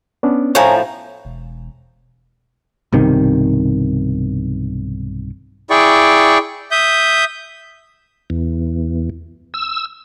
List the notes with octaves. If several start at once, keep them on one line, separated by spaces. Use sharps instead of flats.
B3 C#4 D4
A2 F3 C#5 G#5 A#5
E1
B1 G2 C3 D#3
E4 G#4 D5 G5 C#6
E5 D#6 G6
E2
E6